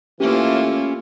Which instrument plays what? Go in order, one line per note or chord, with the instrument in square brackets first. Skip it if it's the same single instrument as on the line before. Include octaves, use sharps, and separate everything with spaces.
[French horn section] A2 E3 A3 [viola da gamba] A#3 E4 F4 [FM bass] C#4 [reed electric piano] G4